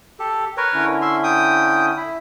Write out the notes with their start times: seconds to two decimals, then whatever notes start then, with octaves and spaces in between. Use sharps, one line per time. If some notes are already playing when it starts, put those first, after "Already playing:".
0.19 G4 A4
0.57 A#4 B4 C#5
0.74 D3 C#4 E4
1.02 E5 C6
1.24 G5 D#6
1.97 E4 B5